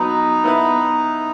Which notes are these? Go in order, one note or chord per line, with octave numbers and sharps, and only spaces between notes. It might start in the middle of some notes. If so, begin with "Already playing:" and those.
Already playing: F#3 B3 D#4 B4
B3 E4 B4